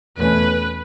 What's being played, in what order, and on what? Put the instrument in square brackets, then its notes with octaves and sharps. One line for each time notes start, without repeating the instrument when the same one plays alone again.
[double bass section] E2 B2 A3 C#4 [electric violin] B4